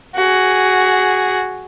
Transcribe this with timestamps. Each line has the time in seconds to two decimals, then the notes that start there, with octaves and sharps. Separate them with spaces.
0.15 F#4 G#4